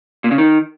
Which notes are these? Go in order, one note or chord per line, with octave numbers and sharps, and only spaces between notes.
A#2
C#3
D#3